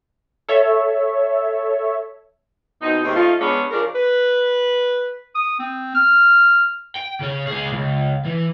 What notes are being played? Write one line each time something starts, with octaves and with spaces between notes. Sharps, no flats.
A4 C#5 E5
B2 C4 D#4
D#2 G#2 C3 C4 D#4
F3 A3 D#4 F4
G#3 B3 C#4 D4
C#3 F3 D4 A#4
B4
D#6
C4
F6
G5
C#3 C#4
C#2 G#4
C#2
E3